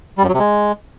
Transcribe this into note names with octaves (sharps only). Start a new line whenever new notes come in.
G3
F#2
F#3
C3
G#3